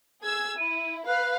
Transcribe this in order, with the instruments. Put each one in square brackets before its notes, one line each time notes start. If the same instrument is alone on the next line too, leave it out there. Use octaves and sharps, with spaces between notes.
[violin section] G#4 E6 G#6
[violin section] E4 [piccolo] D#7
[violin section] B4 F5 [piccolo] F#6